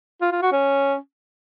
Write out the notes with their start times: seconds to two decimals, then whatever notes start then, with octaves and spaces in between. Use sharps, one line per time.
0.22 F4
0.32 F4
0.42 F#4
0.52 C#4